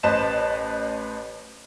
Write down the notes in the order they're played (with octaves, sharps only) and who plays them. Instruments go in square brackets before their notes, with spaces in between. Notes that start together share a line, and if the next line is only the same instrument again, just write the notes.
[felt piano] A1 B4 C5 D#5 A5 E7